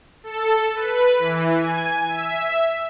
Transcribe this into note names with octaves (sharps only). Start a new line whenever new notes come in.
A4
B4
E3
G#5
E5